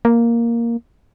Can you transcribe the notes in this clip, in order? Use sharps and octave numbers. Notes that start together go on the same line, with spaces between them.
A#3